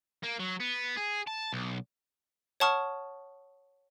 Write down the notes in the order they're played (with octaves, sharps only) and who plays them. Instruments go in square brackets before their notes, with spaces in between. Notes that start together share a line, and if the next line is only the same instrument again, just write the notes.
[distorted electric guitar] A#3
F#3
B3
G#4
A5
B1
[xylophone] C#5 F#5 A5 C#6 D#6 F6